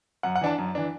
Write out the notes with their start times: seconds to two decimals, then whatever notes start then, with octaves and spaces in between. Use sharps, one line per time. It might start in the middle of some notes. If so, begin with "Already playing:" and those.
0.23 F#2 F#5
0.35 F#5
0.41 E3 D4 A5
0.58 F#2
0.75 E3 D4